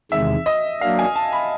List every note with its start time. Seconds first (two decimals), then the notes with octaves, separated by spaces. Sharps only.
0.11 E2 C3 D#3 G#3 E5
0.46 D#5
0.81 F#3 A#3 D4 F5
0.99 G#5
1.16 A5
1.33 B5